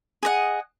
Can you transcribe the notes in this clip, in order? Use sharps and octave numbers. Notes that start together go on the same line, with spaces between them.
G#4 D#5 F#5